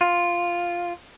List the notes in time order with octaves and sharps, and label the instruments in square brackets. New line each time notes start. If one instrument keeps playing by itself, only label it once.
[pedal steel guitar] F4